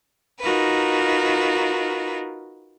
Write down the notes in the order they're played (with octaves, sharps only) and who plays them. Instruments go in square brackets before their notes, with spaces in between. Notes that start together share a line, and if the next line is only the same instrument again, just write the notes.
[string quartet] D#4 F4 F#4 A#4 B4